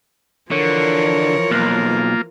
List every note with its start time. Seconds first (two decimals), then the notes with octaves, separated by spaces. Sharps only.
0.51 D3 E3 F3 A#4 C#5
1.51 B1 A#3 F4